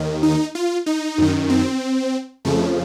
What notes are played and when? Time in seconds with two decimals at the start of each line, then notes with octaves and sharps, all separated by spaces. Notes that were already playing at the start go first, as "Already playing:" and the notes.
Already playing: D#2 D#3
0.23 D#4
0.55 F4
0.86 D#4
1.18 F#2 D#3
1.50 C4
2.45 F2 C#3 F3 A3